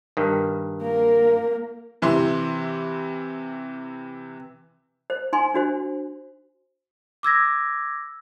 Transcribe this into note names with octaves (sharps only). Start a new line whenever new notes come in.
G2 D#3
A#3 A#4
C3 E3 E4 C6
C5
D#4 G#5 C6
D4 F#4 C5
D6 E6 G#6 A#6